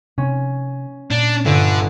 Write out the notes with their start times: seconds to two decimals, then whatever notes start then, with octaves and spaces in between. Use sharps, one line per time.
0.18 C3 C#4
1.11 A#2 D4
1.45 G1 D3 E5